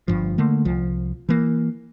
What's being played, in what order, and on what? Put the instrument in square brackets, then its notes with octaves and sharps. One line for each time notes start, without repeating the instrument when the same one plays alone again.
[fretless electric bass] G1 G2 F3
D3 A3 A#3
C2 F3
E3 A#3